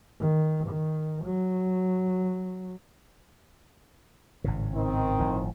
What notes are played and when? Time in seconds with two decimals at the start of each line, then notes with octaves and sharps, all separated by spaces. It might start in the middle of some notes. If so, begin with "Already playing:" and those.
0.20 D#3
0.67 D#3
1.25 F#3
4.44 G#1 A2 C#3
4.74 D#3 C4
5.19 G1 A2 F3